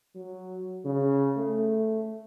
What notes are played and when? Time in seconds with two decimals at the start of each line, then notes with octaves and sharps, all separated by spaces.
0.15 F#3
0.85 C#3
1.36 A3